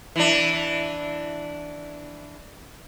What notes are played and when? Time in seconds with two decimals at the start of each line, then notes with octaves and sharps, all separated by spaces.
0.16 E3 D4